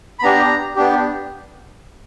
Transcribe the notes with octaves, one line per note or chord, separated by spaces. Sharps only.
B5
B3 D4 G4 A#5
B3 D4 G4